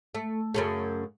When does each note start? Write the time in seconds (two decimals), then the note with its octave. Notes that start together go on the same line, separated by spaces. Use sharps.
0.15 A3
0.54 F#2 C#3 A3